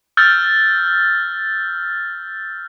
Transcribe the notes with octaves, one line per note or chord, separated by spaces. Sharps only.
E6 F6 G6 A6